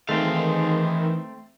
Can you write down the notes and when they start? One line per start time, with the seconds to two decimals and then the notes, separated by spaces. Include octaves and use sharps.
0.09 D#3 E3 G#3 A3 C4 F5